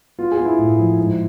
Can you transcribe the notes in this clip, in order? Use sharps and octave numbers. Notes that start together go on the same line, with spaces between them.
B3 F4
G#4
B3
E4
A2
F3
G#2